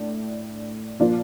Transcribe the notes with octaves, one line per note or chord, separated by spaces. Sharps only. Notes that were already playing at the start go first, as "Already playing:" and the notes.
Already playing: A2 A3 D4
A#2 F3 A#3 D4 F4